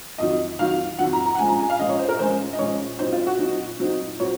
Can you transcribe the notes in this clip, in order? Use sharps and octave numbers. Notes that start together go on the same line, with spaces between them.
F2 D#3 F#3 D#5
F2 D#3 F#3 F5
F2 D#3 F#3 F#5
A#5
A#5
F#5
A#2 F3 G#3 C#4 G#5
A#5
G#5
F5
A#2 F3 G#3 C#4 D#5
C#5
C5
A#4
A#2 F3 G#3 C#4 C5
D#5
A#2 F3 G#3 C#4 C#5
A#2 F#3 C4 D#4 C5
F4
F#4
A#2 F#3 C4 D#4
A#2 F#3 C4 D#4
A#2 F#3 C4 C#5